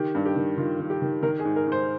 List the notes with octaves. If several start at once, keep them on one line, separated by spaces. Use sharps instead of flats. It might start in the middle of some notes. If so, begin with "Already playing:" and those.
Already playing: D#3 G4
G2
G4
D#3
D#3 F4
D#3
G4
D#3
D#3 A#4
G#4
G#2
A#4
G#2 C5